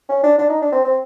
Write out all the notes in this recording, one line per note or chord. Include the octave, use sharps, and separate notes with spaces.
C#4
D4
D4
D#4
D4
C4
C4